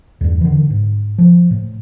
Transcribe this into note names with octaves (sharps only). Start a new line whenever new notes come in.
E2 G2
D3 E3
G#2
F3
A2